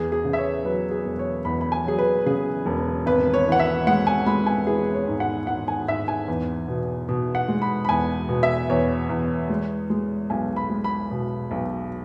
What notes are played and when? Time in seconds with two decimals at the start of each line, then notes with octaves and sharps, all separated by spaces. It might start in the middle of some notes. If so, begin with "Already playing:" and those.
Already playing: E2 G#4
0.12 G#4
0.25 C#3
0.33 E5
0.38 C#5
0.64 F#3 B4
0.91 G#4
1.05 E1
1.19 C#5
1.45 E2 B5
1.61 B5
1.72 G#5
1.86 F#3 G#4
1.99 B4
2.26 C#3 G#4
2.66 E1
3.06 G#1 B4
3.34 C#5
3.47 E3
3.52 F#5
3.59 E5
3.87 G#3 F#5
4.07 G#5
4.26 G#3 B5
4.46 G#5
4.67 E3 G#4
4.94 C#5
5.08 G#2
5.20 F#5
5.47 G#2 F#5
5.68 G#5
5.87 G#2 E5
6.08 G#5
6.28 E2
6.68 B2
7.09 B2
7.35 F#5
7.48 G#3
7.62 B5
7.85 B5
7.89 E2 G#5
8.29 B2
8.43 E5
8.69 E2 C#5
9.09 E2
9.49 G#3
9.90 G#3
10.30 B1 G#5
10.56 B5
10.70 G#3
10.84 B5
11.11 B2
11.51 B1